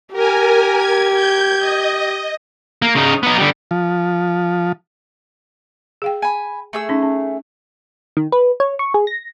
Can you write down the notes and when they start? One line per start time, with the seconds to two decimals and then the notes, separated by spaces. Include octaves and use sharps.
0.13 G4 A#4 G#5
0.74 G#6
1.14 G6 G#6
1.59 D#5
2.82 A#3
2.95 C#3 D#4
3.23 B3 D#4
3.38 D3 G3
3.71 F3
6.02 G#4 F5 G5
6.22 G#5 B5
6.73 A3 G#4 E6
6.89 C#4 D#4
7.02 C#4
8.17 D#3
8.32 B4
8.60 C#5
8.79 C#6
8.94 G#4
9.07 A#6